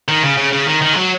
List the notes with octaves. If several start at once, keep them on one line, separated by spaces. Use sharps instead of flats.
D#3
C#3
C#3
C#3
D#3
D#3
G#3
F#3